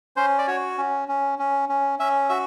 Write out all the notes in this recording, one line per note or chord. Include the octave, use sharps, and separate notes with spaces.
C#4 C5
D5
F#4 C#5
C#4
C#4
C#4
C#4
C#4 E5
F#4 E5